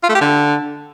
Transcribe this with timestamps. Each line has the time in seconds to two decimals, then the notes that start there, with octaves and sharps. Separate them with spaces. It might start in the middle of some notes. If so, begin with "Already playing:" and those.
0.03 F4
0.09 A3
0.15 G4
0.21 D3